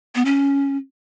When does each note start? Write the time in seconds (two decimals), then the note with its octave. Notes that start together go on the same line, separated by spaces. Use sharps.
0.15 B3
0.25 C#4